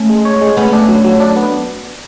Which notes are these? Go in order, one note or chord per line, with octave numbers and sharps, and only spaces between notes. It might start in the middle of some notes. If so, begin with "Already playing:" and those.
Already playing: A3 C#4
G#3
C#5
G#3
A3 B3 C#4
D4
F#3
F#3
D4
B3